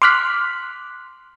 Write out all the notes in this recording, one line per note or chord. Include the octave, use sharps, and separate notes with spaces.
C6 D6 F6 F#6 B6